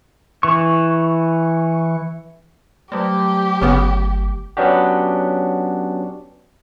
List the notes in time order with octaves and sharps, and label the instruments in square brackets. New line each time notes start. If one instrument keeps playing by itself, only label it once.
[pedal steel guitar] E3 C#6
[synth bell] F#3 G3 A3 [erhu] G4
[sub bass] G1 [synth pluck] C#3 B3
[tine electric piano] F#3 B3 C#4 D4 F#4 G4